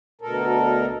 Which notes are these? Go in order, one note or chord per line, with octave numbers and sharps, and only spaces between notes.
D2 B2 A4 A#4